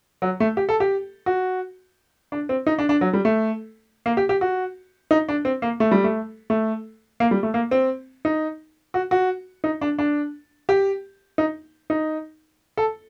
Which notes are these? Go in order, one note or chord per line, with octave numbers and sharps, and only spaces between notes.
F#3
A3
G4
A4
G4
F#4
D4
C4
D#4
D4
D4
F#3
G3
A3
A#3
G4
G4
F#4
D#4
D4
C4
A#3
A3
G3
A3
A3
A#3
G3
A3
A#3
C4
D#4
F#4
F#4
D#4
D4
D4
G4
D#4
D#4
A4